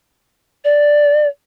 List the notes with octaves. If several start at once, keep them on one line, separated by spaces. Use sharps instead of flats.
D5